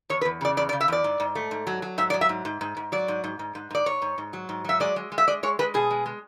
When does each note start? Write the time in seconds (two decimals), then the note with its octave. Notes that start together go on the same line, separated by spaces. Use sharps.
0.10 E2 C#5
0.21 B4
0.25 E2
0.41 C#3 D5
0.57 E2 D5
0.69 D5
0.73 C#3
0.81 E5
0.88 E2 D5
1.04 G#2
1.20 G#2
1.35 A3
1.51 G#2
1.67 F#3
1.82 F#3
1.98 G#2 E5
2.10 D5
2.14 F#3
2.21 E5
2.29 G#2
2.45 G#2
2.61 G#2
2.77 G#2
2.92 F#3 D5
3.08 G#2
3.24 G#2
3.39 G#2
3.55 G#2
3.71 G#2 D5
3.86 G#2 C#5
4.02 G#2
4.18 G#2
4.33 F#3
4.49 G#2
4.64 F#3 E5
4.80 G#3 D5
4.96 G#3
5.12 G#3
5.18 E5
5.27 G#3 D5
5.43 G#3 C#5
5.59 G#3 B4
5.74 B2 G#4
5.91 G#3
6.06 G#3